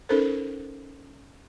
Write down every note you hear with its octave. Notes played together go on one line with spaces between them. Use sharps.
C#4 D#4 A4 A#4 C5